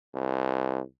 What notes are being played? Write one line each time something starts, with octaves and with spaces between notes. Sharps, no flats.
C2